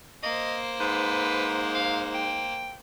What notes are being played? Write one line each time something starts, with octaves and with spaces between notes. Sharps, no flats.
A#3 C5 D#5
G#2 B4
F5
G5